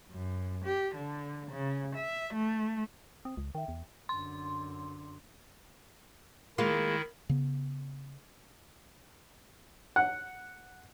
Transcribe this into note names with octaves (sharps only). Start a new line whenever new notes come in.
F#2
G4
D3
C#3
E5
A3
C4 D#6
C#2
D#3 E5 G5
E2
F#2 D3 C6
D#3 G#3 A#3 E4 F4
C#3 B3
F#5